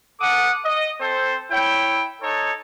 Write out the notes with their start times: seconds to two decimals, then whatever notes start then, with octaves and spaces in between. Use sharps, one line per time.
0.20 A4 F#5 D6 D#6
0.65 D#5
1.00 C4 A4 C5
1.51 E4 C#5 G5
2.22 D#4 A4 C#5